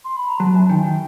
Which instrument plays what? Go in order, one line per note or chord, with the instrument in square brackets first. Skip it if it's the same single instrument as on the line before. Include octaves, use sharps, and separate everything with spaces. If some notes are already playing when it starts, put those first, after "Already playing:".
[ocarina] C6
B5
A#5
[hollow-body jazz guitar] F#3 [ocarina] A5
[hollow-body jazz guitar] F#2 [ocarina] G#5
[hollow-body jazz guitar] D#3 [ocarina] G5
[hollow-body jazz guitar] D#3